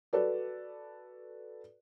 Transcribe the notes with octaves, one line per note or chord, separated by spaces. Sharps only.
F#4 A4 B4 D5